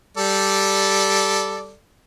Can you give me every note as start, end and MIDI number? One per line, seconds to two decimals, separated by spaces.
0.17 1.74 55
0.17 1.74 69
0.17 1.74 74